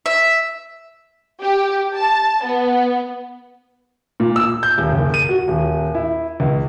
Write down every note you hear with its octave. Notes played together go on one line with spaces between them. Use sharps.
E5
G4
A5
B3
A#2
E6
G6
D#1
F#1
D#7
F#4
D#1
E4
C#2